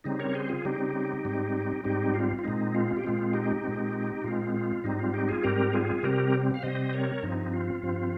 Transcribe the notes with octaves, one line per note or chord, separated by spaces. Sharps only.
C#3 G3 C4 D#4
A#4 C#5
G#4 C5
F4 G#4
C#3 G3 C4 D#4 G4
G#2 G3 C4
G#2 G3 C4 D#4 G4
F4
F4
A#2 G#3 C4 D#4
F4
G4
A#2 G#3 C4 F4
D#4 G4
A#2 G#3 C4
A#2 G#3 C4 F4
F4
G#2 G3 C4 D#4
F4
D#4 G4
F4 G#4
G#2 G3 C4 G4 A#4
F4 G#4
C3 G3 C4 G4 A#4
F5
C3 G3 C4 C5 D#5
A#4 C#5
G2 F3 C4 D#4
F4
G2 F3 C4